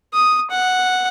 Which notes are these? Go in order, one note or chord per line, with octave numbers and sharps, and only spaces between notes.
D#6
F#5